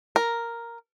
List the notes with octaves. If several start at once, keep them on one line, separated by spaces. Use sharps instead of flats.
A#4